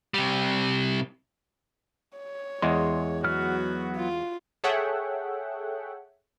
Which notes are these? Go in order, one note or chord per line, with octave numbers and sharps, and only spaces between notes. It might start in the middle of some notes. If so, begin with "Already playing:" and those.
C3 G3
C#5
E2 G#3 C6
F#3 B3 F#4 F6
F4
G#4 A4 C#5 E5 F#5 G5